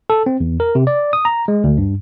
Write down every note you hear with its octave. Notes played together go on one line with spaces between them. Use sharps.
A4
C4
E2
A#4
C3
D5
D#6
A#5
G#3
D2
G2